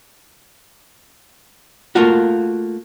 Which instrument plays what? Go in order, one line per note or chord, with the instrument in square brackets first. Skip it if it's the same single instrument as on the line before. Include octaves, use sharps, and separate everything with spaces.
[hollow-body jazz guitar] A3 A#3 F4 F#4